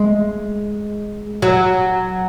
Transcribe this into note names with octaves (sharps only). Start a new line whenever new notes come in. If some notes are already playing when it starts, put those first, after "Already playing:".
Already playing: G#3
F#3